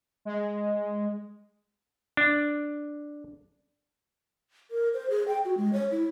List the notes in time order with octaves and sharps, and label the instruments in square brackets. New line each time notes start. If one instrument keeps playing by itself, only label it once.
[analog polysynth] G#3
[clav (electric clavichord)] D4
[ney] A#4
C5
G#4
G5
F#4
G#3
C#5
E4